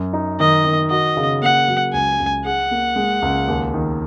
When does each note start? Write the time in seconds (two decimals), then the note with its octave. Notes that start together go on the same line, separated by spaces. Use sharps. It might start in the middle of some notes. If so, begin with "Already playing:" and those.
Already playing: F#2
0.13 D#4
0.40 D#3 D#5
0.65 D#3
0.90 F#4 D#5
1.17 C#3
1.42 A#3 F#5
1.68 F#3
1.93 C#2 G#5
2.20 C#2
2.45 G#4 F#5
2.71 A#3
2.96 G#3
3.22 C#2
3.48 D#2
3.74 D#3